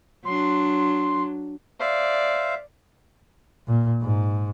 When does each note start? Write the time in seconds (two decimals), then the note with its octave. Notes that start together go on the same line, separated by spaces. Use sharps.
0.25 F#3 D4 C6
1.80 C5 D5 E5 F5
3.67 A#2
4.02 G#2